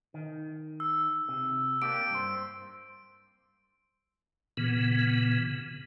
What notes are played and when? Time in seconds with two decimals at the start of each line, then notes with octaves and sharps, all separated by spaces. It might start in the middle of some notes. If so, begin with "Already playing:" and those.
0.14 D#3
0.80 E6
1.28 C3
1.82 A#3 D4 G4 D7
2.11 G2 C5
4.57 A#2 C#3 E3 B3